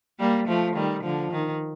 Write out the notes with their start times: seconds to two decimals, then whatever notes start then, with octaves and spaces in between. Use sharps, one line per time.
0.20 G3 A#3
0.48 F3 A3
0.76 D#3 G3
1.04 D3 F3
1.31 D#3